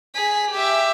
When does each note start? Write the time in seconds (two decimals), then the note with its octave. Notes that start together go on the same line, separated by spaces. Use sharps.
0.14 G#4 B6
0.51 G4 E5